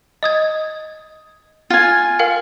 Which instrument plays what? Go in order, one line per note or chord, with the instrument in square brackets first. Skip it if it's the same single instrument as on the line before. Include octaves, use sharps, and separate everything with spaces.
[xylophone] D#5 D#6 G#6
[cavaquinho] F4 G#5
[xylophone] A#4 F5 G5